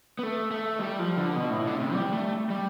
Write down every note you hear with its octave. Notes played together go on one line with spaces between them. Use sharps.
B3
A3
A3
G3
F3
D3
B2
A2
D3
C3
G3
A3
G3